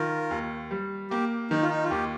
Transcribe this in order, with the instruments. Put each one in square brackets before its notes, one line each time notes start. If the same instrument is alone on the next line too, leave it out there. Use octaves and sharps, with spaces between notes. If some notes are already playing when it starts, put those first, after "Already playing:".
Already playing: [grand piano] D#3 [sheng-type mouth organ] F4 A#4
[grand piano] D#2
G3
[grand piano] A#3 [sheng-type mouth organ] G4
[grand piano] D#3 [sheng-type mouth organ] D#4
[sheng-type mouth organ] F4
D#4
F4
[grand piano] D#2 [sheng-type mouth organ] G4